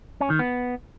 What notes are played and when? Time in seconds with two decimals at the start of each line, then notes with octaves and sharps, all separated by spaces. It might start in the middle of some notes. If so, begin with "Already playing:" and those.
0.21 C#4
0.30 D#3
0.39 B3